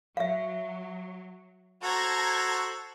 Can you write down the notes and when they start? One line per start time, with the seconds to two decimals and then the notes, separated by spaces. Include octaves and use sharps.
0.17 F#3 E5 F5
1.83 F#4 A4 C5 A5 A#5 G#6